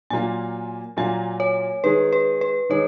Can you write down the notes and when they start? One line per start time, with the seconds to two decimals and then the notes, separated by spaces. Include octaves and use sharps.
0.10 A#2 F#3 A#3 F4 G#5
0.97 A#2 F#3 A#3 F4 G#5
1.40 C#5
1.84 D#3 G#3 D#4 G#4 B4
2.13 B4
2.41 B4
2.69 D#3 G#3 D#4 G#4 C#5